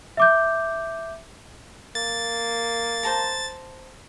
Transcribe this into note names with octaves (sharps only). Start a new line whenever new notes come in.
E5 D6 G6
A#3 A6
C5 A5 A#5